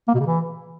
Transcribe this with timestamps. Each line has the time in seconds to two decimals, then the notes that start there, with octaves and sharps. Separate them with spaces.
0.08 A#3
0.14 B2
0.20 C#3
0.26 E3